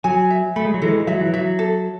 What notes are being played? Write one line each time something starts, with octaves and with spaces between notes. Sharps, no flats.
F#3 G#5
E5
A3 B5
G#3
F#3
E3 G#3 A4
F#3 E5
E3
F#3 E5
A4